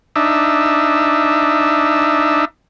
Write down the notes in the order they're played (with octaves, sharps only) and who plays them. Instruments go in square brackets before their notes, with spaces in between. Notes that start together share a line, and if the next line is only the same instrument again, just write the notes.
[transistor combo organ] D4 D#4 E5